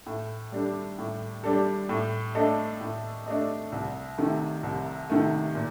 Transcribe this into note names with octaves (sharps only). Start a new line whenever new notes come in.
A2
G3 D4 A4
A2
G3 D4 A4
A2
A3 D4 A4 D#5
A2
A3 D4 A4 D#5
C2
C3 D#3 A3
C2
C3 D#3 A3
A#2